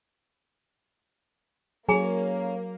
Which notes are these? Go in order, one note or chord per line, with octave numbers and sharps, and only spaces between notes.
F#3 A#3 C#4 G#4 A4 C#5 G#5 A#5